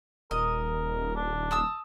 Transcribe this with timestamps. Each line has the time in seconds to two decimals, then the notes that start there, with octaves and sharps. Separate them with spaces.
0.31 D#1 A#4 D#5
1.16 D4
1.51 A5 D#6 E6